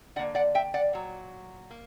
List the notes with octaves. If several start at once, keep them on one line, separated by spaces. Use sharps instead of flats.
D3 A#3 D5 F#5
D5 F#5
E5 G5
D5 F#5
A#2 F#3
A#3